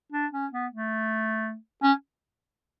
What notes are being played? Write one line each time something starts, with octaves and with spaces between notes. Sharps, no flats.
D4
C#4
B3
A3
C#4